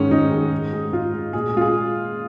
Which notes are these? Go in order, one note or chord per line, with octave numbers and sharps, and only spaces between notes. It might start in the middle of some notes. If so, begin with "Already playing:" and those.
Already playing: G#2 D#3 G#3 C#4
G#2 D#4
D#3 G#3
G#2
G#3
G#2 F4
G#3
A#2 G#4
G#4
G#3 F4
G#4